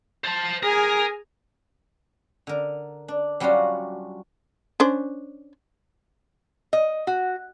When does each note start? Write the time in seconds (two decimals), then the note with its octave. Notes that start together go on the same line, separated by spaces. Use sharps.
0.24 C5 A5
0.63 G#4 A#4 G#5
2.47 D3 A#4
3.08 D4
3.40 F#3 G3 C#4 D4 F4 F#4
4.80 C#4 D4 C5
6.73 D#5
7.07 F#4